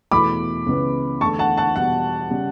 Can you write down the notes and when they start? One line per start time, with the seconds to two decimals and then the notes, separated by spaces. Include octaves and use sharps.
0.11 E2 B2 A3 E4 B5 D6
0.66 C#2 C#3 E3 B3
1.21 E2 D3 A3 A5 C#6
1.39 F#5 A5
1.57 F#5 A5
1.76 E2 B2 G3 F#5
2.30 C#3 G3